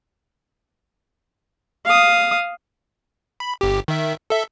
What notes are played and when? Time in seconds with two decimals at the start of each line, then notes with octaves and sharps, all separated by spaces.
1.85 F5 D#6
3.40 B5
3.61 G1 G4
3.88 D#3 E5
4.30 A4 E5